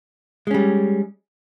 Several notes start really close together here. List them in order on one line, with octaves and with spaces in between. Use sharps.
G#3 C#4 G3